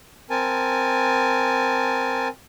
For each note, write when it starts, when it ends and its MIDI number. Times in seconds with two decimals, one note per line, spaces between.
0.30 2.28 60
0.30 2.28 70
0.30 2.28 80
0.30 2.28 81